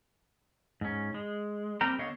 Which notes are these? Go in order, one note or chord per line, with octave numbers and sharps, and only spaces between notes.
G#2 C#4
G#3
G3 A#3 C4 A#4 G5 A#5
D3 B3 C#5 D#5 F5